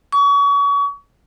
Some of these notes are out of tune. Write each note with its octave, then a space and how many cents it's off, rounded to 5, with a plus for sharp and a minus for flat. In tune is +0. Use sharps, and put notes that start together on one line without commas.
C#6 +35